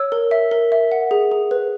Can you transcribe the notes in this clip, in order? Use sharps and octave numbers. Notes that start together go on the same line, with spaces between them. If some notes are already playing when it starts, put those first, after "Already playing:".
Already playing: C#5 E6
A#4
E5
A#4
E5
F#5
G#4
G#4
B4